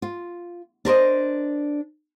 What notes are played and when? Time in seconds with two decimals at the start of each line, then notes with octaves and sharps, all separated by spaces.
0.02 F4
0.85 D4 A#4 C5 D#5